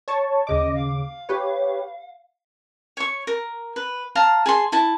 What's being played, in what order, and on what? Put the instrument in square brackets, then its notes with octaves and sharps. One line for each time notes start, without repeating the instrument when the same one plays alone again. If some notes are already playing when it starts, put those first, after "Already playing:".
[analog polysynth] C#5 A5 C#6
[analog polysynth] D#2 C#3 D6 [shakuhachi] D#5
[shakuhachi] F5
[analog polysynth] G4 B4 C#5
[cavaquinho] C#5 C#6
A#4
B4
F5 A5 A#5
G#4 A5 C6
E4 A5